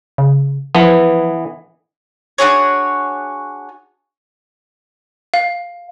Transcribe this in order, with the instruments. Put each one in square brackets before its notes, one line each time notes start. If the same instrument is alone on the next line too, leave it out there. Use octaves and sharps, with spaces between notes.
[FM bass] C#3
[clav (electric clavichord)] E3 B3 [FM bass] F3
[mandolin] D4 F#4 G#4 C#5
[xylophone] F5